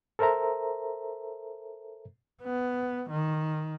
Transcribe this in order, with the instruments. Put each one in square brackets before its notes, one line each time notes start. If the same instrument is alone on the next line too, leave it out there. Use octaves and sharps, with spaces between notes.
[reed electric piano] A4 A#4 C5 E5 A#5
[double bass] B3
D#3